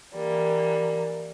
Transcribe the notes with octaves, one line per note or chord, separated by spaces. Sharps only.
E3 G3 A#3